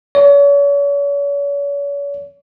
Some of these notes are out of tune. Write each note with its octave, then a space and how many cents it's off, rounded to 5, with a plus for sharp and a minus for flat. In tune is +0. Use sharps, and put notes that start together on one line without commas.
C#5 +40